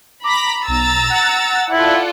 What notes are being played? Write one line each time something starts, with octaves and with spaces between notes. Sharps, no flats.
A#5 B5 D6 A#6 B6
B1 A#5 E6 A6
F#5
E4 F4 A4 D5